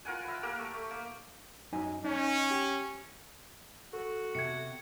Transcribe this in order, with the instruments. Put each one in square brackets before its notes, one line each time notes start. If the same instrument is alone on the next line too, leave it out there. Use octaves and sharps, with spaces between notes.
[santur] F4 A#4 F#5 G#5
B4 E5
A#3 G4 A#4
A3
A3
A#3
[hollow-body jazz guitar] F#2 D#4 G#5
[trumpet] C#4 [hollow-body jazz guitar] D#4
[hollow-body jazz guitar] G4
[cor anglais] F#4 [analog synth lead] A4
[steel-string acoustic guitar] C3 [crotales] G#6 C#7